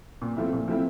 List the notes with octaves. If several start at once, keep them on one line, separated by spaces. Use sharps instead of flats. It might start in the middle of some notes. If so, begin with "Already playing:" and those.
A#2
F3 A3 C4 E4
A#2
F3 A3 C4 E4